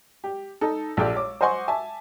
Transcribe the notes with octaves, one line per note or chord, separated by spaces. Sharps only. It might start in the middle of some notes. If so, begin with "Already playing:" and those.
G4
D#4 A4
A#1 G4 A4 D5 G5 E6
C#5 D6
C5 D#5 F#5 G#5 C6 C#6
E5 G#5 A5